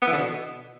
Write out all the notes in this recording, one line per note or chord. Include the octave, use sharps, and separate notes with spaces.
B3
E3
D3
B2